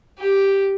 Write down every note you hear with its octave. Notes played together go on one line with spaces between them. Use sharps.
G4